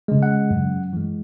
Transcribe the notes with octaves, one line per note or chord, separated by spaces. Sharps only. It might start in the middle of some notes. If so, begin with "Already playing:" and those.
C#3 G#3
F#5
F#2
E3 G#3